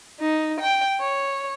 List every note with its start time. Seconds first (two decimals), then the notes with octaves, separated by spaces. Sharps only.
0.20 D#4
0.60 G5
1.00 C#5